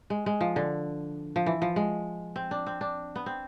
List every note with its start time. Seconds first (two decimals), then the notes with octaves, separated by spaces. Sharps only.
0.10 G#3
0.26 G#3
0.41 F3
0.56 D3
1.36 F3
1.46 E3
1.62 F3
1.76 G#3
2.36 C4
2.51 D4
2.67 C4
2.81 D4
3.16 B3
3.26 C4